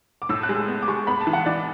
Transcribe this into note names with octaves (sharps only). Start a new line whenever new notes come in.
D6
A2 E6
F#6
G#3
E6
B3
D6
G#3 C#6
B3 B5
A5
E3
F#5
E3 D5